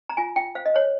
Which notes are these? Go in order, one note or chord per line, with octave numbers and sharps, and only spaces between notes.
A#5
F4 G#5
F4 G5
C5 F5
D#5
C5 C#5